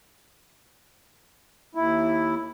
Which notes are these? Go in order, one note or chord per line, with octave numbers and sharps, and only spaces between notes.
D#2 E4